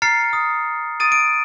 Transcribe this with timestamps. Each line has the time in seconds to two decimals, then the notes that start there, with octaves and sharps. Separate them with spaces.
0.02 A#5 F6 A6 C7 C#7
0.33 D#6
1.00 D#6 A6 D7 D#7
1.12 D7